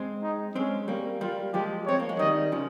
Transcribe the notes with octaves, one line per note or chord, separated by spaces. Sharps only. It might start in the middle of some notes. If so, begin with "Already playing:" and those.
Already playing: G#3 C4
D#4
G#3 C4 C#4
G3 A#3
G3 A#3 F4
F3 G#3 G4
C4 C#5
A#3
G#3
D#3 G3 D#5
C#3 F3